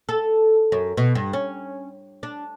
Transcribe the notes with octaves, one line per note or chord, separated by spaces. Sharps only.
A4
F#2
B2
G2
C#4
D4